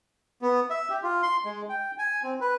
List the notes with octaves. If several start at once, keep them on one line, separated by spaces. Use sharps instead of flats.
B3
E5
G4
F4
C6
G#3
G5
G#5
C4
B4